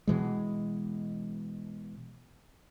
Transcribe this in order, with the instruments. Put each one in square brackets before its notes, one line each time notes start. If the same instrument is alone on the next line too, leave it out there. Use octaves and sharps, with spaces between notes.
[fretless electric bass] B2 E3 G#3